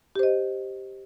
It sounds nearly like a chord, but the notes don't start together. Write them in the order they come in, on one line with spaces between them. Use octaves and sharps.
G4 C5 D#5